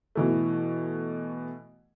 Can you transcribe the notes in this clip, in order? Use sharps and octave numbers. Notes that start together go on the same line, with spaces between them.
B2 E3 A3